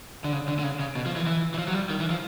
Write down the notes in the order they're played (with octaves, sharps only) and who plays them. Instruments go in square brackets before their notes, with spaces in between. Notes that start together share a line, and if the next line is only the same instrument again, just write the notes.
[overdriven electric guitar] D3
C#3
D3
D3
C#3
C#3
B2
F3
E3
E3
E3
F3
F#3
G3
D#3
E3
F3